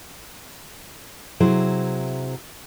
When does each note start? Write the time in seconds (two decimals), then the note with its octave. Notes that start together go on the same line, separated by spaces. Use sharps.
1.40 C3 F#3 E4 G#4 C5